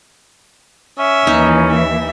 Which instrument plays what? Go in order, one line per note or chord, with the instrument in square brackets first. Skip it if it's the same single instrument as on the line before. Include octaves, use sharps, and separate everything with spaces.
[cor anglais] C#4 [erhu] E5
[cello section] D#2 E3 [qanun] D#4
[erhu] E5